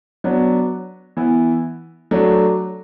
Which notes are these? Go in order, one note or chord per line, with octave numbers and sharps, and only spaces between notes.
F#3 B3 D4
E3 B3 E4
F#3 A3 D4